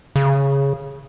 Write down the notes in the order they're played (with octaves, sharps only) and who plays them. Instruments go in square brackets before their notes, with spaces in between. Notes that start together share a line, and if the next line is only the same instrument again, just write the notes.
[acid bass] C#3